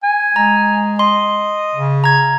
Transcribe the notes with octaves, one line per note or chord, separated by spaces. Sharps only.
G#5
G#3 A#5
D#5 C6
C#3
A#5 G#6